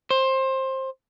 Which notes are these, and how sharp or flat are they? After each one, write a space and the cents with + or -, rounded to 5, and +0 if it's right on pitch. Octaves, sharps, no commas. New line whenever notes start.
C5 +20